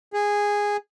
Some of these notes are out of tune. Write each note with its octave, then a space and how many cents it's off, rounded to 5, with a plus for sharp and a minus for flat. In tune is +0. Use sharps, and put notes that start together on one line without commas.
G#4 -10